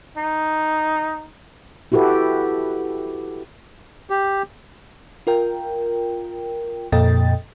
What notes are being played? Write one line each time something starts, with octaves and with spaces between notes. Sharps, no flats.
D#4
E4 F#4 G4 A4 B4
G4
F4 A#4 G5
F2 A#2 A4 D#5 G5 A6